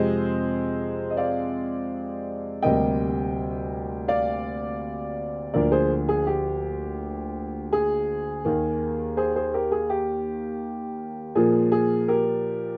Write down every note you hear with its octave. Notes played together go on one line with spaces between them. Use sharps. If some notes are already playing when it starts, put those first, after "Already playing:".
Already playing: F2 C3 F3 G#3 C4 C5 D#5
D#5
D5 F5
D2 C3 G3 A#3 D#5 G5
D5 F5
D2 D3 F3 A#3 A#4 D5
G#4 C5
G#4
G4
G#4
D#2 D#3 A#3
G#4 C5
G#4 C5
G4 A#4
G#4
G4
A#2 F3 A#3 G#4
G#4
G4 A#4